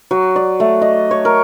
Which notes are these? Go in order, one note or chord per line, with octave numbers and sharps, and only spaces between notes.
F#3
D5
A3
D#5
C#5
A#4